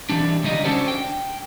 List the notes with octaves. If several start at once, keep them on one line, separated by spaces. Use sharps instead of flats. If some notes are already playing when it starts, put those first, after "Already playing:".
E3 G3 D4
C#2 D#3 G3 D#5
C#4 D4 F#4 A4 C5 D5
G5